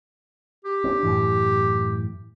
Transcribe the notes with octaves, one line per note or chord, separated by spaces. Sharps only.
G4
C4 D4
F#2 A2 E3